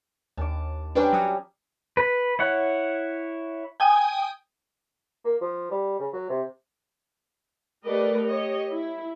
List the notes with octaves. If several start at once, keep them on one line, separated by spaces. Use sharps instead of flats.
D#2 A5 D6
G3 C#4 D4 B4 C5 A#5
F#3 G5 D#6
B4
E4 C#5 F#5
G5 G#5 D#6
A#3
F3
G3
C#3
F#3
C3
A3 G4 A#4 B4 D5 D#5
G4 C#5 D#5
E4